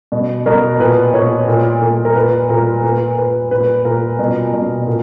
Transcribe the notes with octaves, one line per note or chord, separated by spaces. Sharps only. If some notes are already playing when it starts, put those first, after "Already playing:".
B2
B2 A#4
A#2 B4
A#2 C#5
A#2
A#2
A#4
A#2 B4
A#2 A#4
A#2 B4
A#2 B4
A#2 B4
A#2 A#4
B2
B2
A#2